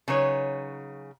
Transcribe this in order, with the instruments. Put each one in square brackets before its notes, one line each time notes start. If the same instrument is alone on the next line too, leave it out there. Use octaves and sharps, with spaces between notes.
[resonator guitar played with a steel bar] C#3 F#3 D#4 B4 C#5